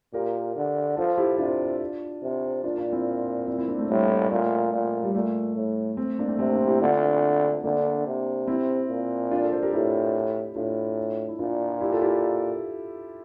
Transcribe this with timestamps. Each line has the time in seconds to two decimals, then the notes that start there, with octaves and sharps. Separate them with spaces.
0.13 A#2 G4 A#4
0.56 D3
0.97 F3 F4 A4
1.18 E4 G4
1.38 C3 D4 F4
2.23 C3
2.63 A#2 D4 F4
2.78 D4 F4
2.92 C4 E4
3.47 C4 E4
3.58 C4 E4
3.68 A#3 D4
3.78 A3 C4
3.89 A2 G3 A#3
4.30 A#2 A3
4.73 A#2
5.03 G3
5.14 A#2 A3
5.56 A2
5.97 A3 C4
6.19 A#3 D4
6.28 A3 C4
6.39 C3 A3 C4
6.53 A#3 D4
6.67 E4 G4
6.80 D3 D4 F4
7.64 D3 A#3 D4
8.07 C3
8.47 C4 E4
8.89 A#2
9.31 D4 F4
9.42 F4 A4
9.52 A4 C5
9.63 G4 A#4
9.73 A2 E4 G4
10.56 A2 D4 F4
11.29 E4
11.39 A#2 D4 F4
11.81 E4 G4
11.92 F4 A4
12.02 E4 G4